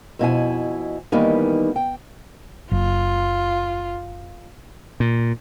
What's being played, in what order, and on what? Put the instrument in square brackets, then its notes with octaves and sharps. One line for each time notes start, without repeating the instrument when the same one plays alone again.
[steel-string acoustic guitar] F2 B2 E4 G#5
D#3 E3 G3 A#3 B3 D#4
G5
[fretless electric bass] F#1 [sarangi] F4
[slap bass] A#2